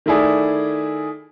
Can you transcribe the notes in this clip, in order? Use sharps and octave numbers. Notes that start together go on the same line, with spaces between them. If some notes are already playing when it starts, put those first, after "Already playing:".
D#3 A3 E4 G#4 D5